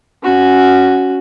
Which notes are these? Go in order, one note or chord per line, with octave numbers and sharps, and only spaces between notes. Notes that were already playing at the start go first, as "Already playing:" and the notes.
C#4 F#4